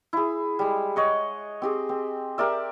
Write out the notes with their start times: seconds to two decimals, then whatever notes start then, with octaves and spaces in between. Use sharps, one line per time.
0.13 E4 G#4
0.59 G3 G#3
0.96 C#5 D#5 F#5
1.62 C4 G4 G#4
1.89 C4
2.38 G4 A#4 D5 E5